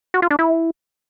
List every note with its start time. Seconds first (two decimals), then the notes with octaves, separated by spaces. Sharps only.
0.14 F#4
0.22 F4
0.31 D4
0.39 E4